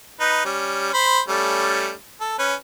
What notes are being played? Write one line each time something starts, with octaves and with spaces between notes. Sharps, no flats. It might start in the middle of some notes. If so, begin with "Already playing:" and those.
D#4 B4
G3 C#4
C5 B5
G3 A3 C#4
A4
C#4 B4